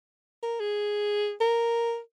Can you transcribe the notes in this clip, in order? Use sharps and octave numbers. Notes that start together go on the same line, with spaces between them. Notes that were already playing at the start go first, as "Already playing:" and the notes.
A#4
G#4
A#4